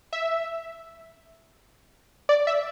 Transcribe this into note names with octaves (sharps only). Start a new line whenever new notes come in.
E5
D5
E5